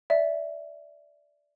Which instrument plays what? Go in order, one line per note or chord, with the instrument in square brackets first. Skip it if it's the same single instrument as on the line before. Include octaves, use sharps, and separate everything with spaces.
[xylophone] D5 E5